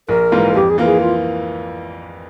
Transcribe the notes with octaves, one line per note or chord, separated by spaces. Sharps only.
A#1 A#4
G#2 E3 A#3 F4
F2 G4
G#4
E3 A#3 F4 A#4
G#4
F4